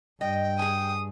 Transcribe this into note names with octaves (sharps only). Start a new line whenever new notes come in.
G2 D#5 G5
G#4 G#5 D#6